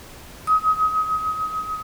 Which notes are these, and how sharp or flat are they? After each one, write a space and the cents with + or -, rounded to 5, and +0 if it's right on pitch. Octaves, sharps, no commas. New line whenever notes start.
D#6 +30